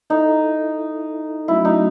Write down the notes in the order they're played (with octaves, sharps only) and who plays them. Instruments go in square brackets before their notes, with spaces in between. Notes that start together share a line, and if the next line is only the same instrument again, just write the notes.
[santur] D#4 [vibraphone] E4 A4 E5
[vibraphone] F#3 A3 C#4 F#4 [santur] E4
[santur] D#4